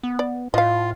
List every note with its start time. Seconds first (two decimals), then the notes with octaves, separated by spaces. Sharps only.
0.03 B3
0.19 D5
0.54 A2 F4 D#5 F5